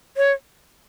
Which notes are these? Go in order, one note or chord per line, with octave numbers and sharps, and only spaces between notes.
C#5